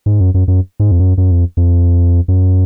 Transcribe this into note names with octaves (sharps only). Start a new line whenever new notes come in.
G#2
F#2
F#2
F#2
G#2
F2
F#2
F#2
F2
F2
F#2